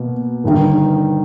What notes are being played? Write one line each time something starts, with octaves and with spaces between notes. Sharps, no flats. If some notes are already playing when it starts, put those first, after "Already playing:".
Already playing: B2 A#3
G1 G2 D#3